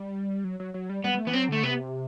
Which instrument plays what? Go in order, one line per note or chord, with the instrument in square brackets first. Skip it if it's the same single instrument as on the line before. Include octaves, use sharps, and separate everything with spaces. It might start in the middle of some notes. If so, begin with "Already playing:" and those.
Already playing: [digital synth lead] G3
F#3
F#3
F#3
G3
[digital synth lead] G3 [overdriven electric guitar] B3
[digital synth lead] G3
A3
[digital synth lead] E3 [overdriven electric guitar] B3
[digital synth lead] F#3 [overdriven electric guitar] C4
[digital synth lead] D3 [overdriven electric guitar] A3
[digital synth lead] C3 [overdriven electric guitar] B3